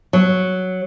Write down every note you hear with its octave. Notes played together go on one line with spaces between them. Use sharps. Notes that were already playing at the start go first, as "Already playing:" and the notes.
F#3